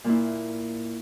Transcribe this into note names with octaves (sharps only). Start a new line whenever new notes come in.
A#2 A#3 E4